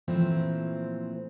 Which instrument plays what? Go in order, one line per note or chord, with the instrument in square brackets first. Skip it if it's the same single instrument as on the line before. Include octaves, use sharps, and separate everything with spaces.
[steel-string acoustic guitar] A#2 E3 F3 A3 C4